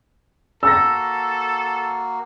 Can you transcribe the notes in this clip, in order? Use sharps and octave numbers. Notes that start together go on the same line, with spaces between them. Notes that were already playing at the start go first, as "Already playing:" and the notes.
A#3 F#4 A4 E6 A#6